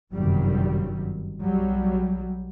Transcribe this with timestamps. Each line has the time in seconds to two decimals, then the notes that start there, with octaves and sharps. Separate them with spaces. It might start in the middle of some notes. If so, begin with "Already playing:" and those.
0.13 G1 F#2 C3 D#3 F#3 G3
1.40 B1 F#3 G3